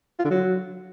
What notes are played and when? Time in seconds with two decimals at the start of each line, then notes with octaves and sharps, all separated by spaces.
0.19 F4
0.25 D3
0.31 F#3